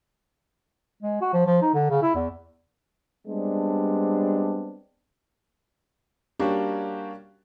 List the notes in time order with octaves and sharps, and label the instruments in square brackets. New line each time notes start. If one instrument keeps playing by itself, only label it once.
[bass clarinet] G#3
F#4
F3
F3
D#4
D3
C#3
E4
E2
[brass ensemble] G3 G#3 B3 C4 D4
[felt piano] G3 A#3 C#4 D4 F#4 G4